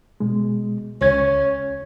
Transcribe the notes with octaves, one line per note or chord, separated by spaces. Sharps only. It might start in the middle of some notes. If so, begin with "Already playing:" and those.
B2 G#3
C#2 C#4 G#6